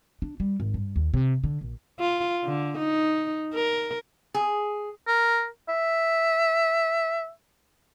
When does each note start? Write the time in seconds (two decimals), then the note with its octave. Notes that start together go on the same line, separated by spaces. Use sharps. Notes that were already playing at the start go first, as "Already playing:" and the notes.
0.22 D4
0.40 G3
0.60 G#1
0.74 G2
0.96 D#2
1.14 C3
1.44 D3
1.61 A#1
2.00 F4
2.44 D3
2.79 D#4
3.54 A#4
4.34 G#4
5.07 A#4
5.69 E5